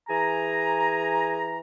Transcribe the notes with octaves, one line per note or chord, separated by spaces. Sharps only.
E3 G#4 G#5 A#5